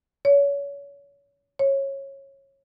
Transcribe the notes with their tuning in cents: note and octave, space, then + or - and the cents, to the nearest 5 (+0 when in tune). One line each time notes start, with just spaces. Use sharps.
C#5 +30
C#5 -20